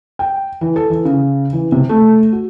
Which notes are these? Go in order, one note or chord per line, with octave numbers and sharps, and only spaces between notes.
G5
E3
A4
E3
C#3
E3
C3
A3
F#4